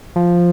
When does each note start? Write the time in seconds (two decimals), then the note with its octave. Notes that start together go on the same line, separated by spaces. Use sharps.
0.16 F3